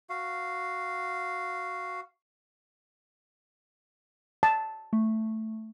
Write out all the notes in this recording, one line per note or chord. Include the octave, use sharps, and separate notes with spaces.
F#4 F5
A5
A3